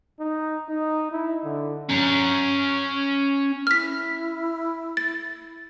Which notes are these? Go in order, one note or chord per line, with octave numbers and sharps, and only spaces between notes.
D#4
D#4
E4
D3
C#4 A#5
E4 F6 B6
A6